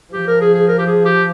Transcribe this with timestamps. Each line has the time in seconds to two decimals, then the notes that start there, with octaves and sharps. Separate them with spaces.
0.13 F3 G4
0.27 A#4
0.41 G#4
0.54 G#4
0.68 A#4
0.78 G4
0.87 G#4
1.05 G4